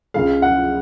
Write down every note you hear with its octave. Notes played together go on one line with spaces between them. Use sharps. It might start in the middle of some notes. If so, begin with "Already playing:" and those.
C#2 C#3 G#3 F5
F#5